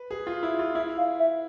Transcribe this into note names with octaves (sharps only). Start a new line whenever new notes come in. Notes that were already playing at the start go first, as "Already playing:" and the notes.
Already playing: B4
G#4
F4
E4
F4
E4 E5
F5
E5